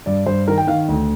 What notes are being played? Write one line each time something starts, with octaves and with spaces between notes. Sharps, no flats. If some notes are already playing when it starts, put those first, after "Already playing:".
G2 D5
G2 C5
D#3 A#4
G5
D#3 F5
D2